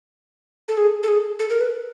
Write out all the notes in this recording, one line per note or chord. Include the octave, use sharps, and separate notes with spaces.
A4
G#4
A4
G#4
A4
A#4
B4